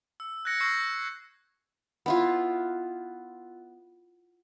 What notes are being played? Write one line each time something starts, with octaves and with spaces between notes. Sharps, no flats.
E6
F#6 G#6 A#6 C#7
C#6 E6 G6 A#6 C7
B3 E4 F4